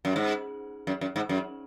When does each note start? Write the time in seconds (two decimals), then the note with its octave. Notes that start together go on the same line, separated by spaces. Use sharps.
0.05 F#2
0.16 G#2
0.87 F#2
1.01 F#2
1.16 G#2
1.29 F#2